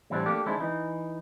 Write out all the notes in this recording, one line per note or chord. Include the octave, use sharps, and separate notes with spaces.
A2 E3 G3 C4 D4
A3 A#3 D4 G4
D#3 G#3 C4 D4 E4
E3 D#4